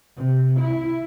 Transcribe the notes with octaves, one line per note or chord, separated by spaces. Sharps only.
C3
E4